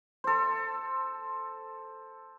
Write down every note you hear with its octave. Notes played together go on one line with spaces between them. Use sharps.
A4 C5